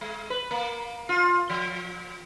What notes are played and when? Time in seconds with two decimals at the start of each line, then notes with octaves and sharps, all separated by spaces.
0.01 G#3
0.30 B4
0.51 A#3
1.09 F4
1.50 F3